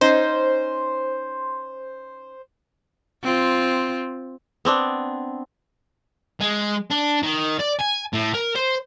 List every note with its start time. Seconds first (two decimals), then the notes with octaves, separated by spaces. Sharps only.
0.01 C#4 D#4 C5
3.23 C4 F4
4.65 B3 C4 D4
6.41 G#3
6.90 D4
7.23 D#3
7.59 D5
7.79 G#5
8.13 A2
8.34 A#4
8.55 C5